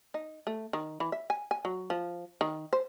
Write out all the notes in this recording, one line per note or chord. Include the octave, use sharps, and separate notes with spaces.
D#4
A3
D#3
E3
E5
G#5
G#5
F#3
F3
D#3
C5